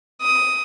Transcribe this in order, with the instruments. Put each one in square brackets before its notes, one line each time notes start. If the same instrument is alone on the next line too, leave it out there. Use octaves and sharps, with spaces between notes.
[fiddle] D#6